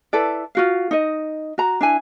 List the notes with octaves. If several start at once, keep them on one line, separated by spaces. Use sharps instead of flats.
E4 A4 B4 D5
F4 F#4 F5
D#4 D#5
F#4 A#5
D4 E4 G#5